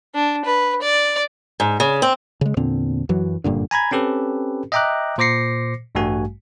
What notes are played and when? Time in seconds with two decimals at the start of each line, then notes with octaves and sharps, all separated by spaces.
0.15 D4
0.45 B4
0.82 D5
1.60 G#2
1.80 C#3
2.02 C4
2.41 C#3 G#3
2.57 E2 A#2 D3 C4
3.09 F#2 E3 F#3
3.44 F#1 G2 A#2 D3
3.71 G#5 A#5 B5 G#6
3.91 C4 C#4 G4 A4 B4
4.72 D#5 E5 G5 A#5 D6 F#6
5.18 A#2 C5 D6 A#6 C7 C#7
5.95 A1 G2 G3 A3 F#4 G#5